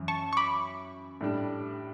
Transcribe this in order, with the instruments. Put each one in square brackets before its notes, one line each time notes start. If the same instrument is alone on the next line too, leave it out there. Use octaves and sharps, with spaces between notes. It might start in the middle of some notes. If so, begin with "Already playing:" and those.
Already playing: [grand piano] F#2 E3
[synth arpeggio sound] A5 C#6
C#6
B5 D6
[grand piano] A2 G3 D4